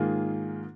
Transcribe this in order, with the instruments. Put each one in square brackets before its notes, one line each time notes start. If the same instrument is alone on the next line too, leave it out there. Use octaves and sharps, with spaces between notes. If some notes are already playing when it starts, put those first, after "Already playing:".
Already playing: [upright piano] G#2 D#3 A#3 F4 G#4